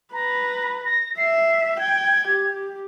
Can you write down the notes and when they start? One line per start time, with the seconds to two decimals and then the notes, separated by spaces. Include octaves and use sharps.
0.13 B4 A#5
0.85 A#6
1.18 E5 C7
1.79 G5 G#6
2.27 G4